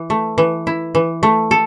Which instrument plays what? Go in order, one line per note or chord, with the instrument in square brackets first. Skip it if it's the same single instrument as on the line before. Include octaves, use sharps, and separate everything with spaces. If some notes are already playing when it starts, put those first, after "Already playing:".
Already playing: [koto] E3
A3
E3
E4
E3
A3
A4